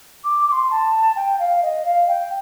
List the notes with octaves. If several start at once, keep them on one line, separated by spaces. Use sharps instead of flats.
D6
D6
C6
A5
G5
F5
D#5
F5
G5